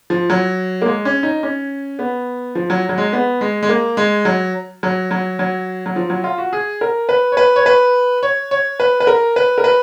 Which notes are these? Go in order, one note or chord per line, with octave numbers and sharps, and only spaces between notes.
F3
F#3
A#3
G#3
C#4
D#4
C#4
B3
F3
F#3
F#3
G#3
B3
G#3
G#3
A#3
G#3
F#3
F#3
F#3
F#3
F#3
F3
F#3
F4
F#4
G#4
A#4
B4
C#5
B4
C#5
B4
C#5
C#5
B4
B4
A#4
B4
A#4
B4